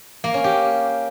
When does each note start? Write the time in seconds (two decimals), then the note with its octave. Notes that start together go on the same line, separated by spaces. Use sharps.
0.24 A#3
0.34 C#4
0.44 G4